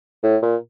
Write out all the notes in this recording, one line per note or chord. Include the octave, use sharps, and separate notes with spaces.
A2
A#2